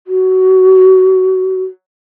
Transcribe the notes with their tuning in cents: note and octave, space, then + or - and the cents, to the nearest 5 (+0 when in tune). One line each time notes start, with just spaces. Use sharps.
F#4 +20